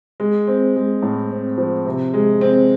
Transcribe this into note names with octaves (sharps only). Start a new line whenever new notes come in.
G#3
C4
G#3
A2
C4
F3
C3
G#3
C4